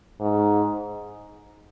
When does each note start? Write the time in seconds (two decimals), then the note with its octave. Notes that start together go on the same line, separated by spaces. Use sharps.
0.20 G#2